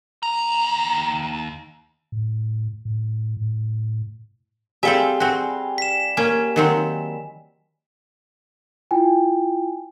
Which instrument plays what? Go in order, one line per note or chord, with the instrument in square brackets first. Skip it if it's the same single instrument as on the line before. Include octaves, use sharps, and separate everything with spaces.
[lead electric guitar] D#2 A#5
[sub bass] A2
A2
A2
[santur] G3 G#4 F5 [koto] C4 A4 E5 [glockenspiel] G#5 G7
[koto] C4 F#4
[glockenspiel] B6 E7
[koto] A#3 C#4 [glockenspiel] G#5
[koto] D#3 F#3 C4
[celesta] E4 F4 G5 G#5